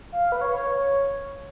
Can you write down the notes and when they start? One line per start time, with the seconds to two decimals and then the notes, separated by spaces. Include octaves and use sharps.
0.12 F5
0.32 B4
0.41 C#5